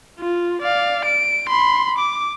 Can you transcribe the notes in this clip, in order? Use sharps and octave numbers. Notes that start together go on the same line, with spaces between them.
F4
D5 F5
D7
B5 C6
D6